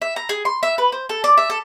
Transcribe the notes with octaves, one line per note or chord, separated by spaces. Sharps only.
E5
A#5
G#4
C6
E5
B4
C5
A4
D5
E5
A4